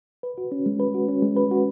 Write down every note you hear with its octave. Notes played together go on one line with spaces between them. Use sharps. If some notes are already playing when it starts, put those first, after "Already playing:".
B4
F#4
C#4
G#3
B4
F#4
C#4
G#3
B4
F#4